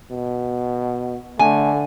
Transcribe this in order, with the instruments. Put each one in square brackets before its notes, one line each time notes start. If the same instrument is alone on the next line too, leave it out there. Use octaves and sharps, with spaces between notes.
[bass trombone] B2
[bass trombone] D3 [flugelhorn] A3 [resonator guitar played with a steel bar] G#5